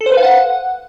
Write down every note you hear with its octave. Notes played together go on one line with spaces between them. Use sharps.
A4
C5
B4
F5
F#5